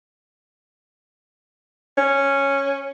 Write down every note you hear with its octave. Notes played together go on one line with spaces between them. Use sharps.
C#4